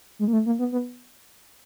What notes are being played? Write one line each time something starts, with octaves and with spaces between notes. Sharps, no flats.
G#3
A#3
A3
A#3
B3
B3